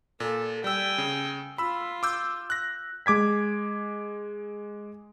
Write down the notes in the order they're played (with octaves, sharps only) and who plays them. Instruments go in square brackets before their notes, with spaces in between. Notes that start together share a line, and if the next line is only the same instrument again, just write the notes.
[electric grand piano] A#2 [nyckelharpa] A4
[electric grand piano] G3 E6 [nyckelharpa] G5 G#5
[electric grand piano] C#3
[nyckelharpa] F4 [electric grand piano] B5 E6
[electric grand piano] D6 E6 G6
F#6 A#6
G#3 D6 G#6 B6